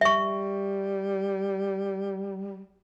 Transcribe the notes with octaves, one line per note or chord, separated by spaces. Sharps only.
G3 E5 C#6